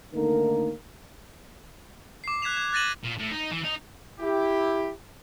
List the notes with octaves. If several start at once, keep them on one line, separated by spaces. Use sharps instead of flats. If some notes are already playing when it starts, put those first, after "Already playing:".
D3 D#3 A3 A#3 D#4 A#4
D6 C7
F#6 G#6 B6 E7 F7
G#6
F#6 A6 A#6 D#7 F#7
A#2
A2
D#4
E3
D#4
E4 G4